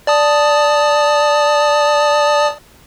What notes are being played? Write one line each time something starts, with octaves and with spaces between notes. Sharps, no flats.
D5 A5 D#6